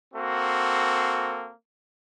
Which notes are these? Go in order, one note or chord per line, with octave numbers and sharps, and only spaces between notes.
A#3 C4 F#4 A4